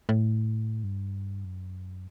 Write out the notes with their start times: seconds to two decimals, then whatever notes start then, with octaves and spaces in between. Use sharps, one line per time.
0.09 A2
0.84 G2
1.45 F#2